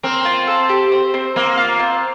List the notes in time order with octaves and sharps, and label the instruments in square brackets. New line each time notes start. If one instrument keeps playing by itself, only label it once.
[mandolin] A#3 [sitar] C4
[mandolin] F4
A4
G4
C5
C4
[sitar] A#3 [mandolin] C4
[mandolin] F4
C4